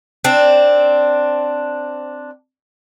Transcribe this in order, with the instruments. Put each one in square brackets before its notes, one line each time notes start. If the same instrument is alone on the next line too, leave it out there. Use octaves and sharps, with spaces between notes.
[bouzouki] C4 D4